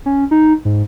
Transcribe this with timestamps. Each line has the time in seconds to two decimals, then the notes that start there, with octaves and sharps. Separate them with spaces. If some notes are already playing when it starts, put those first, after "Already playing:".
0.06 C#4
0.31 D#4
0.65 G#2